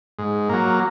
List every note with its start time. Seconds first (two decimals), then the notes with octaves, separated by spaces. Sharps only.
0.19 G#2
0.49 F#3 A#3